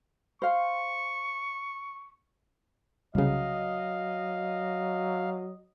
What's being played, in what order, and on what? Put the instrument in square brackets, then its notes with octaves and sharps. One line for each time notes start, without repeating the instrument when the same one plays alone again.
[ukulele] C5 F5 [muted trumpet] C#6
[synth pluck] C2 C#3 [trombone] F#3 [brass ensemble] D#5 [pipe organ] F5